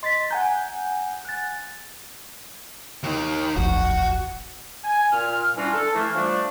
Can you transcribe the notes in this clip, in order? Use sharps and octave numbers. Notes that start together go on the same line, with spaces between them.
D#5 C6 A6 B6
F#5 G#5 A#5 G6
F#6 A6
D#2 D#3
D#1 A1 F2 F#4
G#5
A#2 F6
E3 G3 C#4 D4 F4 F#4
A4
E3 A3 A#3
F3 G3 A3 D4